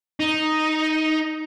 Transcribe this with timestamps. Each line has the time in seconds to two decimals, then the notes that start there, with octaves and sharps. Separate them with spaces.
0.20 D#4